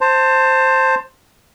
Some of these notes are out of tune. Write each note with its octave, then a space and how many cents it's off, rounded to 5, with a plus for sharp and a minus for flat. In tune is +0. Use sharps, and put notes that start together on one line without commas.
C5 +5 A5 +25